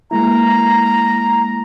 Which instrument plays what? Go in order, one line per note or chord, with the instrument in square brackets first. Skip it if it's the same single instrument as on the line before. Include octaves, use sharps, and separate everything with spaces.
[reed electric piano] G#3 A#3 E4 [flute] A#5